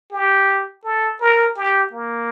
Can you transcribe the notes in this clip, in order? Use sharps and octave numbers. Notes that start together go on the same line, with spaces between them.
G4
A4
A#4
G4
A#3